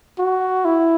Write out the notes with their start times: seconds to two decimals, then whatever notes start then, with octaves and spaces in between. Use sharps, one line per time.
0.19 F#4
0.65 E4